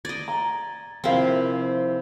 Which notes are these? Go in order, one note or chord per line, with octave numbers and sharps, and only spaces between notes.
D5 D#5 G#6 A6
A#5
C3 F3 C4 E4 G4 A#4 F5